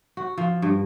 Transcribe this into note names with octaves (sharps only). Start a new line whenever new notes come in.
F#4
F3
G2